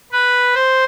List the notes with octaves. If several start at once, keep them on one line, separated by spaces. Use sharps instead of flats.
B4
C5